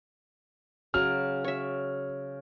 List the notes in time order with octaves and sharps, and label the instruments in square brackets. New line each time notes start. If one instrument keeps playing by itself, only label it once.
[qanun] C#3 F#3 [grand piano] F6
[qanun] C#5 E5